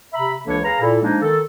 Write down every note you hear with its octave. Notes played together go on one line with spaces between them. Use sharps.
C3 E5 A#5 B5
C#2 E3 A#3 D4 A4 C#5
G#4 B4 F5 A#5
A#2 E4 A4
F3 G#3 A#3 D4 D#4
D#3 A4